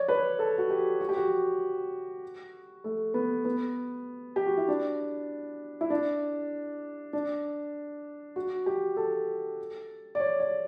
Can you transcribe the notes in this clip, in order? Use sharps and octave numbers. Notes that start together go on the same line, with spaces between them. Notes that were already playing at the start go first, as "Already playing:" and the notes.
Already playing: C#5 D5
B4
A4
F#4
G4
F#4
G4
F#4
A3
B3
B3
G4
F#4
E4
D4
E4
D4
D4
F#4
G4
A4
D5
C#5
D5